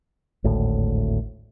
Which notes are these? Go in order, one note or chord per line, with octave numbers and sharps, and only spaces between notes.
G#1 D2 A2